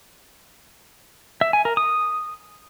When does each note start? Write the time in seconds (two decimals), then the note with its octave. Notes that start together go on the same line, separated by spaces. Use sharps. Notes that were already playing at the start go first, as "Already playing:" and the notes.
1.41 E5
1.53 G#5
1.65 A#4
1.77 D#6